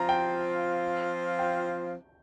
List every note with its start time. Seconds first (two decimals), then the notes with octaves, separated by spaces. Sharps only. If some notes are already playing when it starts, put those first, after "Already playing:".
Already playing: F3 C4 F4 A#5
0.09 G5
1.39 G5